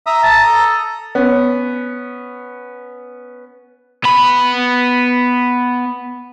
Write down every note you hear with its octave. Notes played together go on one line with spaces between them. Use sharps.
E5 A#5 D#6
A5
A4
B3 C#4
B3 B5